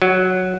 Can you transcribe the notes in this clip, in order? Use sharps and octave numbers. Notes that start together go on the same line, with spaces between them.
F#3